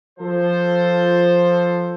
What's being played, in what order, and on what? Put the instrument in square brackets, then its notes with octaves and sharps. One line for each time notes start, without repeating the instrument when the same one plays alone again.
[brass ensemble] F3 A4 C5